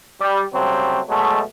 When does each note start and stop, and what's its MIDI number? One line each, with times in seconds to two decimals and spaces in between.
0.21 0.43 55
0.54 1.01 49
0.54 1.01 54
0.54 1.01 55
0.54 1.01 57
0.54 1.01 60
1.09 1.41 47
1.09 1.41 54
1.09 1.41 56
1.09 1.41 57